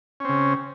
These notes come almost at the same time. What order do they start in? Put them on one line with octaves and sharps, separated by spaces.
C#4 C4 C#3